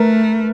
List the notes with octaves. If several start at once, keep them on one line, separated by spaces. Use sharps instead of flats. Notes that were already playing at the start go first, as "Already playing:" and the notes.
Already playing: A3 A#4 B4